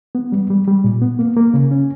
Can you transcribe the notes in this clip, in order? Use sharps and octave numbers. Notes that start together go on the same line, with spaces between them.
B3
G3
G3
G3
A#2
B3
A#3
A#3
C#3
C#4